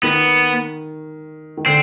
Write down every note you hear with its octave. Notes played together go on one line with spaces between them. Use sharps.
D#3 B3
D#3
D3 C4